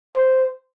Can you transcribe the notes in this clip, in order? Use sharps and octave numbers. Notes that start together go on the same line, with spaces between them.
C5